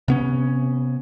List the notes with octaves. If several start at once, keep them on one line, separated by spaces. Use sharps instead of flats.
C3 B3 C#4